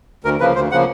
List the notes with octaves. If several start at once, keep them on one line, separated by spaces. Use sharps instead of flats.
D2 A#4
C#3 F3 A#3 B4
D2 C5
C#3 F3 A#3 F#5